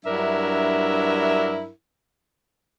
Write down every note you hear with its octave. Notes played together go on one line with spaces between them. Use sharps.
G2 F#3 D4 E4 A#4 E5